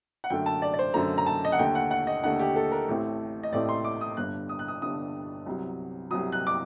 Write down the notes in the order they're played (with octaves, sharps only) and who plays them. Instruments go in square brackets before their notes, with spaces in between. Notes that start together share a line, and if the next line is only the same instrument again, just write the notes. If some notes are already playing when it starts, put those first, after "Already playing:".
[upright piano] F#5
F#2 D3 A3 G5
A5
D5
D5
C5
F#2 D3 A3 A#5
A#5
A5
D#5
F#5
D#2 D3 A3 G5
F#5
F#5
D#5
D#2 D3 A3 F#5
G4
A4
A#4
A1 A2 A3 C4
D#5
A1 A2 A3 C4 D5
C6
D6
D#6
G1 G2 D3 F#6
D#6
F#6
D#6
G1 G2 D3 D#6
C2 C3 F#3
C2 C3 F#3 D#6
F#6
D6